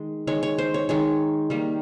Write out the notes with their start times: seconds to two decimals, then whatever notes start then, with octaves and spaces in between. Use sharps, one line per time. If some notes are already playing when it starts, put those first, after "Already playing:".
Already playing: D#3 G#3
0.27 D#3 G#3 C#5
0.43 C#5
0.58 C5
0.74 C#5
0.89 D#3 G#3 C#5
1.50 D#3 G3 A#3